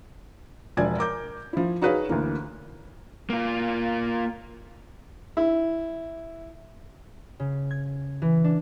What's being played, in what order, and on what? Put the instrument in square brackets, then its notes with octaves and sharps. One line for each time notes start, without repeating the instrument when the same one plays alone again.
[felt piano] E1 F3 F4 D5 G#5 G#6
A#4 D6 G6
F3 E4
D#4 F#4 G#4 B4 C#5 F5
D2 E3 A#3
[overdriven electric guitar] A#3 F4
[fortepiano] E4
[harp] C#3
G#6
E3
D4